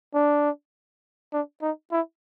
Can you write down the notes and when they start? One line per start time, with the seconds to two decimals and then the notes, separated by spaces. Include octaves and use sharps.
0.14 D4
1.32 D4
1.62 D#4
1.92 E4